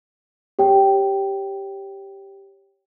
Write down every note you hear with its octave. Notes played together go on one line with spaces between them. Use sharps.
G4 C#5 G5